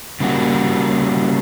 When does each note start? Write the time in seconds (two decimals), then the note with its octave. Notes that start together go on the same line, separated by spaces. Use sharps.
0.20 C#3 G3 A#3 F#4